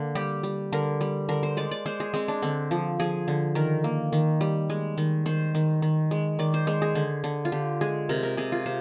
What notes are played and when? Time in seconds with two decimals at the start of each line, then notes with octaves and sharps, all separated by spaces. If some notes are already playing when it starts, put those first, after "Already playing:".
Already playing: D3 A#3
0.15 G3 G4
0.43 G3
0.72 D3 A#4
1.01 G3
1.29 D3 A#4
1.43 C5
1.57 G#3 D5
1.71 D5
1.86 G#3 C5
2.00 G#4
2.14 G#3 C4
2.28 D4
2.42 D3 C4
2.71 F3
3.00 F3 G#4
3.28 D3
3.55 D#3 A#4
3.84 A#3
4.13 D#3
4.41 G3
4.70 G#3
4.98 D#3
5.26 D#3 C5
5.55 D#3
5.82 D#3
6.11 G#3
6.39 D#3 D5
6.54 C5
6.67 G#3 C5
6.82 G#4
6.95 D3
7.24 D3
7.45 F4
7.52 D3 G4
7.81 G#3 G#4
8.09 C3 A#4
8.23 A#4
8.37 C3 G#4
8.52 F4
8.66 C3 C5